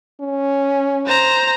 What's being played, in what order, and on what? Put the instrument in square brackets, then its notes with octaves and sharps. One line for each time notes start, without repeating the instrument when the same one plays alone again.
[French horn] C#4
[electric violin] C5 A#5